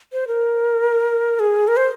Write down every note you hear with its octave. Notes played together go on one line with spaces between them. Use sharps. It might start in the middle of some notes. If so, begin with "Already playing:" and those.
C5
A#4
G#4
A#4
C5